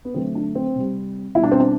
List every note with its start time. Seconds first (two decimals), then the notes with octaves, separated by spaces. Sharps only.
0.05 B3
0.14 D3 F#3 A3 C4
0.35 D4
0.55 C4
0.75 C3 G3
1.35 B2 G3 E4
1.43 D4
1.51 C4
1.60 D4